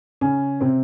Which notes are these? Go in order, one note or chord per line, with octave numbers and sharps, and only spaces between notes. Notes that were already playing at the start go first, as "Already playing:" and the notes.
C#3 C#4
C3 C4